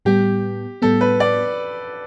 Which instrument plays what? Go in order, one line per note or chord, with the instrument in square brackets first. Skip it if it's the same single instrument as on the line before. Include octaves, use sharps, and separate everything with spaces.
[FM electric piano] A2 G3 B3 [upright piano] G4
[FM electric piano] A2 G3 B3 [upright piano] A4
[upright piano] B4
D5